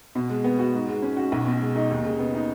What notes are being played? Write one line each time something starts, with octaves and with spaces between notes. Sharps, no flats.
B2
G#3
B3
F#4
G#2
G#3
C#4
F#4
B1
B2
G#3
D#4
D#2
C#3
B3
D#4